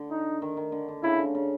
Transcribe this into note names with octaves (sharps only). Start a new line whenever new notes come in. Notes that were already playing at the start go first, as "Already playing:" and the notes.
Already playing: D3
D#4
D#3
D#3
D3
D3
C#3 E4
D3
C#3